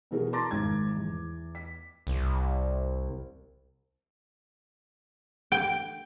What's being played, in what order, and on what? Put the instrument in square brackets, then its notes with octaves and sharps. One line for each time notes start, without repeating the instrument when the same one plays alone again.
[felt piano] B2 E3 B3 F#4 G#4 A#4
A5 A#5 C6 D6 A6 A#6
G#1 G#2 G#6
E2
B6
[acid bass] C2
[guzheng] G5